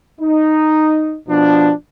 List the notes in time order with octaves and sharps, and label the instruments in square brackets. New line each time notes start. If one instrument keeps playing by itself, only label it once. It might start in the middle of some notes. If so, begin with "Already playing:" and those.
[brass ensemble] D#4
B2 F3 D4